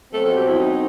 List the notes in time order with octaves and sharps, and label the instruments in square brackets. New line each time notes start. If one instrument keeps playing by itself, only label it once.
[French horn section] B2 F#3 C4 F#4 C5 [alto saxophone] A4
[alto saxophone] A4
G4
E4
D#4